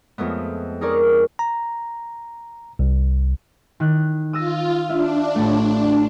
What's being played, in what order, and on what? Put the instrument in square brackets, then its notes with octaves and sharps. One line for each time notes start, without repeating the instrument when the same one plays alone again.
[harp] F2 G#3 A3 B3
D#4 G#4 A#4 D5 C#6
[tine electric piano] A#5
C2
[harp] D#3 F#6
[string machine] F4 [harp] D#6 E6 A#6
[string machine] D4 [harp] F4 E5
[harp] A1 A2 A3